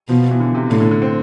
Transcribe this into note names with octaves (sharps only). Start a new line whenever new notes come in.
B2 F3
E3
D3
C3
A2 D3
D3
D3
C4